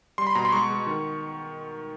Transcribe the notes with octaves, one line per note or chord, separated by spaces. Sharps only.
G3 C6
B5
B2 A#5
C6
G#3 C#6
G#3
D#3